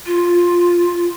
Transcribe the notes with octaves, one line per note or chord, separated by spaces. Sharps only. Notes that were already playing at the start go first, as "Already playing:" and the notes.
F4